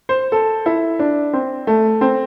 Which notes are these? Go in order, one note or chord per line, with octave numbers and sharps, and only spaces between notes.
C5
A4
E4
D4
C4
A3
C4